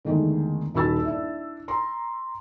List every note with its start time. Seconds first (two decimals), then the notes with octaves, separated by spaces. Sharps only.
0.05 E2 D3 D#3 G#3 A3
0.74 D#1 D#4 F#4 B5 E6 A6
1.05 D4 E4
1.68 A#5 C6